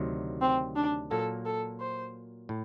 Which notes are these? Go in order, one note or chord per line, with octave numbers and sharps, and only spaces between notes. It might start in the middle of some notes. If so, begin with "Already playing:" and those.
Already playing: D2 C3 D#3 F#3
C4
D4
A#2 F#3 A#3 A4
A4
C5
A2